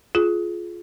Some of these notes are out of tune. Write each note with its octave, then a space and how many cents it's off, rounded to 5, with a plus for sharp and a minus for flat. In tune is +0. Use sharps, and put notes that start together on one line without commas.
F4 +0 G#4 +25